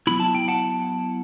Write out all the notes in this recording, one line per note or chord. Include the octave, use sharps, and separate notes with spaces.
F#3 B3 E4 B5
A5
G5
F#5 A5